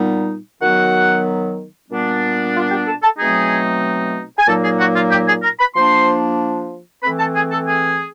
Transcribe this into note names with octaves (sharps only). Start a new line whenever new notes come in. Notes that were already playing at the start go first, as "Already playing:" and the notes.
Already playing: A#2 G3 B3 D#4
D#3 F#3 B3 F#4 F#5
A#2 G3 B3 D4
F4 F5
G4 G5
A4 A5
A4 A5
B2 F#3 A3 C4 D#4 G#4 G#5
G#5
A#2 F#3 A#3 D#4 A4 A5
G#4 G#5
F#4 F#5
F4 F5
G4 G5
G#4 G#5
A#4 A#5
B4 B5
F3 A#3 D4 C5 C6
E3 A3 C4 B4 B5
A4 A5
G#4 G#5
A4 A5
G#4 G#5